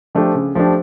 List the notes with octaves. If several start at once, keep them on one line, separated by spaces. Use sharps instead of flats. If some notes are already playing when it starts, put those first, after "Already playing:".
F3 A3 D4 G4
C#3
F3 A3 D4 G4